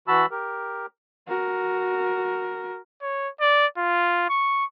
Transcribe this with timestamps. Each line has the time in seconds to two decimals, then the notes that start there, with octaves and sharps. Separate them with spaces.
0.08 E3 F#4 A5 B5 E6
0.31 G4 A#4
1.27 F#4 A#4
3.02 C#5
3.41 D5
3.77 F4
4.29 C#6